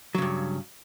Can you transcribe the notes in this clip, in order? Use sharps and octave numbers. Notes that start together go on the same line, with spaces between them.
G2 C#3 F#3